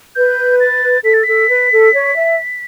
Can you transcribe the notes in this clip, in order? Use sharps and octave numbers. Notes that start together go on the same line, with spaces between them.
B4 G6
A6
A4 B6
A6
A4 B6
B4
A4
C#5
E5